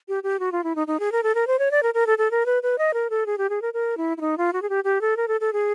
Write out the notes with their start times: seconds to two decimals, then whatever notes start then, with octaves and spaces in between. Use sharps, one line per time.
0.08 G4
0.23 G4
0.40 F#4
0.52 F4
0.64 E4
0.76 D#4
0.87 D#4
1.00 G#4
1.12 A#4
1.23 A4
1.35 A#4
1.47 C5
1.59 C#5
1.71 D5
1.83 A#4
1.94 A#4
2.07 A4
2.18 A4
2.31 A#4
2.46 B4
2.63 B4
2.78 D#5
2.94 A#4
3.10 A4
3.26 G#4
3.38 G4
3.50 G#4
3.62 A#4
3.74 A#4
3.97 E4
4.17 E4
4.21 D#4
4.38 F4
4.53 F#4
4.62 G#4
4.70 G4
4.84 G4
5.01 A4
5.17 A#4
5.28 A4
5.41 A4
5.53 G#4